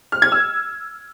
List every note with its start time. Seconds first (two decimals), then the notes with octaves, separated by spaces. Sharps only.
0.12 F6
0.22 G#6
0.32 E6